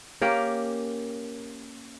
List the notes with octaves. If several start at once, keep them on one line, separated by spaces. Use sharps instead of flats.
A#3 C#4 G4 A#4